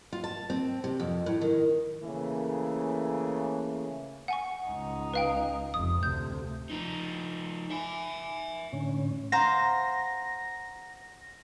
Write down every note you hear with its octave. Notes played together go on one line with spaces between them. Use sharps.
F4
A5
C4
C3
F2
A2
D#3
C#3 E3 A3 A#3
F#5 G#5 C#6
C#2 D#4
B4 F5 G5
F1 F2 D#6
D2 C3 G6
F3 D#4
E5 G#5
A2 D3 C#4
C5 F5 F#5 A#5 A#6